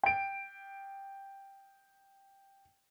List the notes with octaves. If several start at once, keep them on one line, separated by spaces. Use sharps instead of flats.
G5 D7